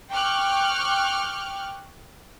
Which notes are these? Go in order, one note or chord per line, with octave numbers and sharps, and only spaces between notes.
G5 C#6 D6 F6 F#6